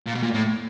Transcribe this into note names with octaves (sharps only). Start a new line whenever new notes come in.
A#2
B2
A#2
A2